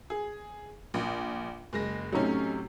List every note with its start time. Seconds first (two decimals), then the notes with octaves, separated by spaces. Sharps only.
0.10 G#4
0.94 A#1
1.73 F#1 G#3 A#6
2.12 A2 C3 F#3 C#4 D#4